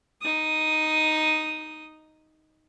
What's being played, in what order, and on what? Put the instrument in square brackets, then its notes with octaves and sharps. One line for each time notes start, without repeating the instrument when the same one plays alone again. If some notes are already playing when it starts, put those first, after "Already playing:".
[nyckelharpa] D#4 D#6